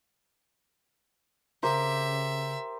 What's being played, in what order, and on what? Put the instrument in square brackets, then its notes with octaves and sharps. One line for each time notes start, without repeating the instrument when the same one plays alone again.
[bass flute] C#3 [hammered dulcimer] G4 A#4 C5 [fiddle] E5